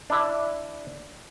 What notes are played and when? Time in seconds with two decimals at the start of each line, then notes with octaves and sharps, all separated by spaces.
0.10 D4 E4 E5